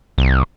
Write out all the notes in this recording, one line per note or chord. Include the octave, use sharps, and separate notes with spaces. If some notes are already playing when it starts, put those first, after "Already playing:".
C2